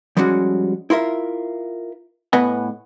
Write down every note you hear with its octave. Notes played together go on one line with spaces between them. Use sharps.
F3 G3 G#3 C#4 F#4
E4 F4 A#4 E5
A2 B3 B4 D#5 F#5 G#5